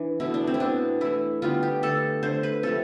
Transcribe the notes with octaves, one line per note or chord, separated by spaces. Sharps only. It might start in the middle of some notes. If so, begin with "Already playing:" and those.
Already playing: E3 D4
B2 A3 E4
D4
C4
E4
B2 B3 D4
E3 A3 E4
D3 G3 B3 F4
G4
D3 A3 A4
D3 A3 C5
B4
C3 F3 A3 A4